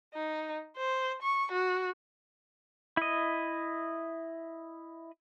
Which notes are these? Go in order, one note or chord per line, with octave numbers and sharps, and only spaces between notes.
D#4
C5
C#6
F#4
E4 D#5